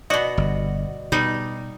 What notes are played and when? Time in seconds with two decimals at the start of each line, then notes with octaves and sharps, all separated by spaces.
0.10 B2 F#4 D5 D#5
0.37 G1
1.12 B2 G3 D#4